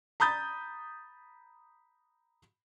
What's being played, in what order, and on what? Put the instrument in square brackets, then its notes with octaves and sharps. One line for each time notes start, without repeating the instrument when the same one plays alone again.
[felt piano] A#5 B5 D#6 G6 A6